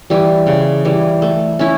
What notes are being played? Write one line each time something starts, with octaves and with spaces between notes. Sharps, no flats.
E3 G3
C#3
E3 G3
A3
C#4 E4